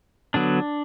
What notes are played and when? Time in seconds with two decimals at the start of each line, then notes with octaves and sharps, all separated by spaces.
0.34 D3 F#3 B3 D4